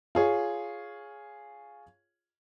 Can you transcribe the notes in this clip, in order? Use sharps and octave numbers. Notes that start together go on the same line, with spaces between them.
F4 G#4 C#5